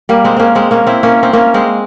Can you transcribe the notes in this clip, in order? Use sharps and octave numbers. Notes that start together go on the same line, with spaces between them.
G3 A#3
G#3 C4
A#3 C4 C#4
G#3 C4
A#3 C#4
C4 E4
A#3 C#4
C4
A#3 C#4
G#3 C4